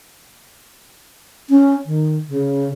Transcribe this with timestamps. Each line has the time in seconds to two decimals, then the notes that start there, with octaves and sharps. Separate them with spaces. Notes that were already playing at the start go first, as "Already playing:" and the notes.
1.49 C#4
1.85 D#3
2.28 C#3